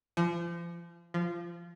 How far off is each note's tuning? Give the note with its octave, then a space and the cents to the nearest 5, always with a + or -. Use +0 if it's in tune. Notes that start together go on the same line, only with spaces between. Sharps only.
F3 -35
F3 -20